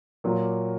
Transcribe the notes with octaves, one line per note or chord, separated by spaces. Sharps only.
A#2 F#3 A#3